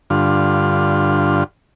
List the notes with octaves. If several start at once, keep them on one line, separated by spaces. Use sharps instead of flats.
G2 D3 F4